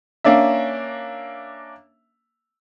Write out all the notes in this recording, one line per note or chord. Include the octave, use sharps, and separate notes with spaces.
A#3 C#4 D4 E5